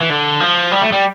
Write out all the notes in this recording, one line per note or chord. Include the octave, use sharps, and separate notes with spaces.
E3
D3
F3
G3
A3
G3